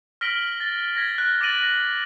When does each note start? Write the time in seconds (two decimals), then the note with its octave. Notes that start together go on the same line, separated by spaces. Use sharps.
0.21 F6 A#6 B6 D7 F#7 G7
0.60 A6
0.95 G#6 A#6 B6
1.14 F6 F#6
1.41 D6 A6 A#6 D7 D#7 F#7
1.63 A#6